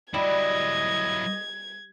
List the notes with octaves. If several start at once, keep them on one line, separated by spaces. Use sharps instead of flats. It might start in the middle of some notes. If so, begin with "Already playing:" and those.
F#3 G3 E4 D#5 G#6